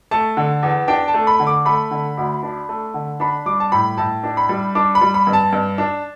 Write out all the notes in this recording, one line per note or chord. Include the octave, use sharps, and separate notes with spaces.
A3 A5
D3
E2
D4 G5
A5
A3
B5
D3
D6
A3 B5
D3
D2
D4
A3
D3
D4 B5
G3 D6
A5
A2 B5
A2 A5
D4
B5
G3
D4 D6
B5
G3
B5
G2
A5
G2
D4